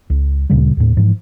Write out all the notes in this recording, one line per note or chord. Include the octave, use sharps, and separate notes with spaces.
C#2
D2 A#2 C#3 G3
D#2 A2
G#2 E3 F3